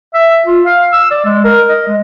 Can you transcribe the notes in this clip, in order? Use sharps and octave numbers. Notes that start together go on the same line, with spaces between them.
E5
F4
F5
E6
D5
G#3
A#4
D#5
G#3